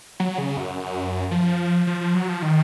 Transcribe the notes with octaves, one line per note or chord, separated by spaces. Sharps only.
F#3
C#3
F#2
F3
F3
F3
F#3
F3
D#3